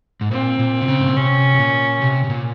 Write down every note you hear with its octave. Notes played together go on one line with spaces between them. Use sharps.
G#2
A#2 C4
A#2
C3
C#3
G#2
A#2
C3 C#4
C3
A#2
C3
C3
A#2